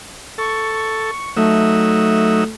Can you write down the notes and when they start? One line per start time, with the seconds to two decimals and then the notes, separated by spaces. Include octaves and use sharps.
0.38 A4 C#6
0.73 C#6
1.37 F#3 A3 D#4 E5